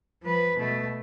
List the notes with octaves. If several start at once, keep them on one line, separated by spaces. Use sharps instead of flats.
F3 B4
B2 A3